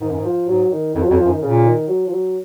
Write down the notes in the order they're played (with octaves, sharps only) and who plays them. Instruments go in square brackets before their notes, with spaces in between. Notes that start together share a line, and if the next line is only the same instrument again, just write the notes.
[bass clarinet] G#2 [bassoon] D#3
[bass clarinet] F#2
G#2
[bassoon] F3
[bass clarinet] G#2 [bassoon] F#3
[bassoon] D#3
[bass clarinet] F2 [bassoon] D#3
[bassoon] F3
[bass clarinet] F2 [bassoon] F#3
[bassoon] F3
[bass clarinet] F#2
[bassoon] D#3
[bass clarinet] A#2 [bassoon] C#3
[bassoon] D#3
F#3
F3
F#3